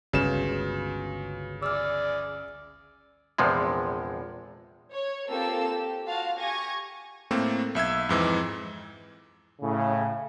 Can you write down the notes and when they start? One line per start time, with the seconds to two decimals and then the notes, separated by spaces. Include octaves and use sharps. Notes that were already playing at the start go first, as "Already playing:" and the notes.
0.13 G1 C#2 C#3 F#4 B4 E7
1.63 G#4 D5 E6 F6
3.38 A#1 E2 C3 F3 G#3
4.90 C#5
5.29 A#3 C4 F4 G4 A4 E6
5.73 G4
6.06 F4 F#4 F5 A5
6.37 G4 G#5 C#6 G#6 A#6
7.31 A2 A3 A#3 C4
7.75 B1 E5 E6 G#6
8.09 F2 G#2 E3
9.61 A2 C#3